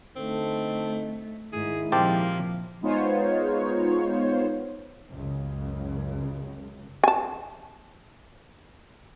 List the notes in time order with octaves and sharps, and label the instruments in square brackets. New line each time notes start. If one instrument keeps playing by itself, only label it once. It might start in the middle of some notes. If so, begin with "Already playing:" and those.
[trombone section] D3 D#4 A4 [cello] A3 [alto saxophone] C4
[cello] G#2 [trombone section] D#3 G#3 E4 [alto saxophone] G#4
[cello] A#2 F3 [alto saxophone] A#3 [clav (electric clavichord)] C4 G4 A5
[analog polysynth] G#3 B3 D#4 F4 C5 C#5
[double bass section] C#2 F#2 C#3
[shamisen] G#5 A5